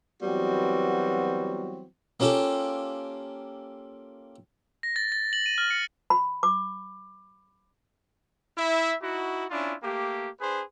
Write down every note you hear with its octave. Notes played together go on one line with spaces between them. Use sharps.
E3 F#3 G3 B3 C4 F#4
A#3 C#4 F4 G4 A4
A#6
A6
A6
F#7
D#7
F6
C#7
B5
D6
E4 E5
D#4 E4 F#4
C#4 D4 E4 F4
A3 A#3 G4
D4 G#4 B4 C5